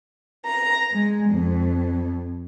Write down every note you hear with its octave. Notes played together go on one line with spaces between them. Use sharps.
A#5
G#3
F2